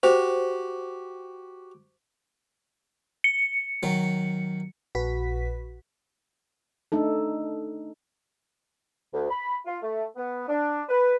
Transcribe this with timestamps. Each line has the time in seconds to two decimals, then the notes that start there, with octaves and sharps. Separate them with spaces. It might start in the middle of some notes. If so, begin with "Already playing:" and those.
0.03 F#4 G4 C5
3.24 C#7
3.83 D#3 F#3
4.95 A#1 F#4 B4 B6
6.92 A3 D4 D#4 A4
9.14 D2
9.29 B5
9.66 F4
9.83 A3
10.16 B3
10.49 D4
10.89 B4